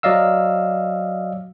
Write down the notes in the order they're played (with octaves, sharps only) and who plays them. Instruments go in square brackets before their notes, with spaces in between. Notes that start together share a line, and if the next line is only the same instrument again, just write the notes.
[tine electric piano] F#3 D5 D#5 F5 E6